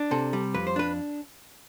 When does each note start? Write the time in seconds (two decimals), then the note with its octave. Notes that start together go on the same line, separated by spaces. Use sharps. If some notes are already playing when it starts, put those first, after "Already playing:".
Already playing: D4
0.11 C3 A4
0.33 G3
0.54 F2 B4
0.67 C5
0.76 D4 B4